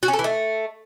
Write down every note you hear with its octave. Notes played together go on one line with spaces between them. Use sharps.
F#4
C#4
A4
E3
A3